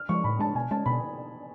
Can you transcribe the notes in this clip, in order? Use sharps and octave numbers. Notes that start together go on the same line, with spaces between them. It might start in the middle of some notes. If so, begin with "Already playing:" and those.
Already playing: F6
F3 G#3 C#6
A2 B5
G#3 D4 A5
B2 G#5
G#3 C#4 A5
B2 B5